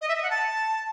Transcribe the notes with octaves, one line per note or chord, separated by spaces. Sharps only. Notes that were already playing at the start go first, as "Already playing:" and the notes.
D#5
E5
D#5
F#5
A5